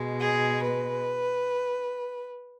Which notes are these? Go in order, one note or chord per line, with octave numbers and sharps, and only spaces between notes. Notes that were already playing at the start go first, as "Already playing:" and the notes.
Already playing: B2 G#3
G#4
B4